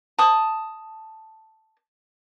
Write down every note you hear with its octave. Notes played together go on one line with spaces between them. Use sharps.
A5 D#6